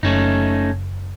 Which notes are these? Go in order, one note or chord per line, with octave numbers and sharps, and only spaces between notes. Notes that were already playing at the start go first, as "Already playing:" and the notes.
F#1 A3 C#4 D#4